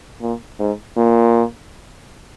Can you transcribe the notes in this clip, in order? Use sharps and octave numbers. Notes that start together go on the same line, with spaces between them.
A#2
G#2
A#2